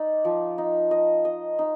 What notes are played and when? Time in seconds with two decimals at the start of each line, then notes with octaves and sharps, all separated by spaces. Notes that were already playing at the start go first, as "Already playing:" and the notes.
Already playing: D#4 D5
0.25 F3
0.58 D#4
0.91 D#5
1.25 D#5
1.59 D#4